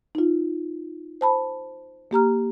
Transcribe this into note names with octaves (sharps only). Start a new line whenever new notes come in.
D#4 F4
C5 A5 B5
A#3 G4 A#5 F6